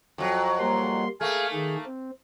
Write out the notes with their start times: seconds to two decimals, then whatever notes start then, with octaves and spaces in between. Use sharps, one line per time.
0.18 F2 F#3
0.59 G3 A#3 C6
1.21 A3 A#3 G#4 F5 G#5
1.53 D#3 G#4
1.86 C4